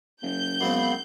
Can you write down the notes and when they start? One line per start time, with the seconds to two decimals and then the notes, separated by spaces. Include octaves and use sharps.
0.22 F#1 G6
0.61 F#2 G#3 B3 C4 F5 B5